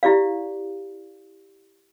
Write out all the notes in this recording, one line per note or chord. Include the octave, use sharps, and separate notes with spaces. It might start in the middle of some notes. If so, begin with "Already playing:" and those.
E4 G4 D5 F5